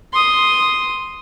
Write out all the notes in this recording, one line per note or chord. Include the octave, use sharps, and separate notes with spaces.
C6 D#6